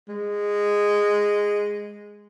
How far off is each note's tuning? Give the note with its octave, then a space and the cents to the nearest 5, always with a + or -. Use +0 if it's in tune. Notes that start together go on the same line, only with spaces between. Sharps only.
G#3 -10